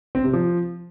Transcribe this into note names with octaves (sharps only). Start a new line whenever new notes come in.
C4
C3
F3